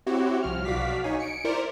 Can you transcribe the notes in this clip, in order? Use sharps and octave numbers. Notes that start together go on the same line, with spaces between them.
C4 E4 F#4 G4 C#5
C2 F3 F6
B1 F#4 D5 F5 D6 B6
B1 D#4 C#5 G#5
C#7 D7
E4 A#4 C5 D5